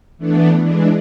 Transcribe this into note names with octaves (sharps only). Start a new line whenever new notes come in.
E3 A3 B3 D4
E3 G#3 D4